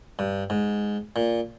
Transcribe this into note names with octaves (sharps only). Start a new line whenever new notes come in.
G2
G#2
A#2